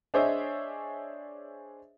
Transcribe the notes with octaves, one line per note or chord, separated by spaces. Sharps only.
D4 G#4 C5 C#5 D#5 E5